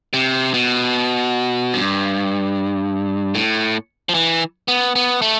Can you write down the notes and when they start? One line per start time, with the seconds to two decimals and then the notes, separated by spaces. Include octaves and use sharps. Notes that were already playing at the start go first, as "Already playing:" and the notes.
0.13 C3
0.54 B2
1.74 G2
3.35 A2
4.09 F3
4.15 E3
4.68 B3
4.96 B3
5.22 A3